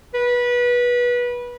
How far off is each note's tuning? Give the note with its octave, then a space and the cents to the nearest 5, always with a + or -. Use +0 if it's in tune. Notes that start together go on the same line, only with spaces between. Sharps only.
B4 -20